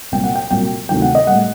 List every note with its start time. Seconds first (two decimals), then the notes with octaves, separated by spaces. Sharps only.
0.12 C2 A#2 F#3 G5
0.24 F#5
0.35 G5
0.51 C2 A#2 F#3 G5
0.89 D2 C3 D#3 F#3 G5
1.02 F#5
1.15 D#5
1.27 A2 G3 F#5